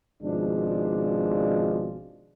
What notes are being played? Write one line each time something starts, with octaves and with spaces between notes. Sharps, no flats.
G#1 B2 F3 G#3 D4